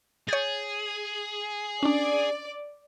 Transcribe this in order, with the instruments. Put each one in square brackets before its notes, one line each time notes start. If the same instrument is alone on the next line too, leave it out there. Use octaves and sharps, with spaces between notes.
[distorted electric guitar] G#4 [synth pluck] C#5 G6 A6
[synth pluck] C#4 D4 [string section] D5